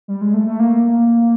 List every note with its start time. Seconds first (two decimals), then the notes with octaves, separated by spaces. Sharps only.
0.08 G3
0.21 G#3
0.34 A3
0.47 A3
0.59 A#3